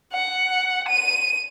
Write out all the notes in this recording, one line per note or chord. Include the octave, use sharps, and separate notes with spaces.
F#5
D#7